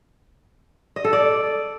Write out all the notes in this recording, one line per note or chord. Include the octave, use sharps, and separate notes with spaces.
D#5
A4
D5